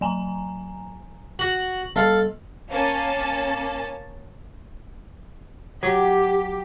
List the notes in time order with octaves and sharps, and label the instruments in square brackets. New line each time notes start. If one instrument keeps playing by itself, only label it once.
[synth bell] F#3 G#5 A#5
[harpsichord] F#4 [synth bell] F#7
[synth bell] G3 [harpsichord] A4 F5
[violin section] A#3 C#4 A5
[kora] F#3 [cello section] G4